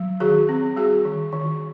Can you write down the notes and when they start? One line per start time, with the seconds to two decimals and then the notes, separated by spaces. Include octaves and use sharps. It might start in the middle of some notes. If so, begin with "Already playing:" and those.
Already playing: F#3
0.20 D#3 F#4 G#4
0.49 C4
0.76 G3 F#4 G#4
1.05 D#3
1.32 D#3